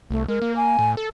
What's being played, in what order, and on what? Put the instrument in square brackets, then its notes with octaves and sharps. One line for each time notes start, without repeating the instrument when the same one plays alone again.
[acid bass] C2 [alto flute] A3
[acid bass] G#3 [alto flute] A#4
[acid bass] A#3
[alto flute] G#5
[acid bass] A2
A4